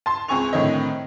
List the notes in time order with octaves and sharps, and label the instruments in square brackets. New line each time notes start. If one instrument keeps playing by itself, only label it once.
[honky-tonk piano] A5 C6
C#2 C4 G#4 G#5 C#6 F7
A2 D3 D#3 C4 C#5 D#5